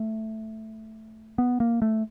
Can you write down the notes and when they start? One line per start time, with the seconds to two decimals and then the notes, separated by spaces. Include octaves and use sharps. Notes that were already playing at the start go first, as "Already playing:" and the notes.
Already playing: A3
1.38 B3
1.60 A#3
1.82 A3